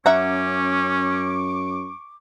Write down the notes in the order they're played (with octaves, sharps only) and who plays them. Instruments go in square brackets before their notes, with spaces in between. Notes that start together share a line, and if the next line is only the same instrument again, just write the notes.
[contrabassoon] F#2 [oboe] C#4 [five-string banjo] E5 F#5 A#5 [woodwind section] C#6 D6